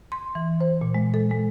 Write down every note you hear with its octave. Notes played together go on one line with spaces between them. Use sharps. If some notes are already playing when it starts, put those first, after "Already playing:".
C6
E3
C5
A#2
G#3
A4
G#3